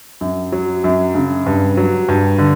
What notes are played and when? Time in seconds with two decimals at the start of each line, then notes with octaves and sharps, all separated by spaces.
0.21 F#2
0.52 F#3
0.84 F#2
1.15 C#3
1.46 G2
1.77 F#3
2.08 G2
2.38 D3